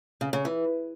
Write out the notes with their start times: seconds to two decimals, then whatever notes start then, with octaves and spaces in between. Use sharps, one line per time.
0.21 C#3
0.33 C#3
0.45 E3